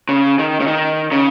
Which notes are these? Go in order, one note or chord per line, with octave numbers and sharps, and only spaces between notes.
C#3
D#3
C#3
D#3
C#3